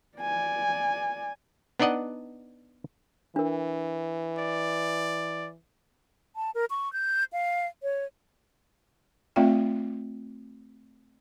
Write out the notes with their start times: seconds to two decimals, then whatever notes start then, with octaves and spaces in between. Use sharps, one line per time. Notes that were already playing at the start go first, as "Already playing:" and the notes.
0.18 D5 G#5
1.80 B3 D4 D#4 D5 D#5 F#5
3.36 E3 D4 A#4
4.39 D5
6.36 A5
6.55 A#4
6.70 C#6
6.93 G6
7.33 F5
7.83 C#5
9.36 A3 C4 F4 D5 E5 G5